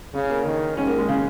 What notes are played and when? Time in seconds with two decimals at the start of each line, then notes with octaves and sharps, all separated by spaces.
0.14 C#3 C#4
0.30 A#3
0.46 D#3
0.77 G#2 C#4
0.88 A#3
0.98 G#3
1.08 C#3